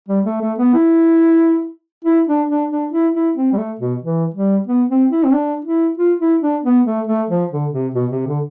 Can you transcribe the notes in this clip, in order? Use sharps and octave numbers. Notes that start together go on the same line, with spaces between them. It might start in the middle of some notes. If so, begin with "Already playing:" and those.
G3
A3
A3
B3
E4
E4
D4
D4
D4
E4
E4
C4
G3
A3
B2
E3
G3
B3
C4
E4
C4
D4
E4
F4
E4
D4
B3
A3
A3
F3
D3
C3
B2
C3
D3